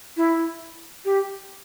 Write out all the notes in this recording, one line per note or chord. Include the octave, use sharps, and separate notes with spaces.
E4
G4